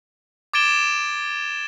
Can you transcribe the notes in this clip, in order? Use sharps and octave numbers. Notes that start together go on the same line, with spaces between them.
D6 G#6 A6 D7 E7 G7